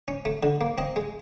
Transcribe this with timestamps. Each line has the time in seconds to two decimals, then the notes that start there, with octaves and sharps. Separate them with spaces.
0.08 C#4
0.25 A3
0.43 D3
0.61 A#3
0.78 C4 D#5
0.96 G#3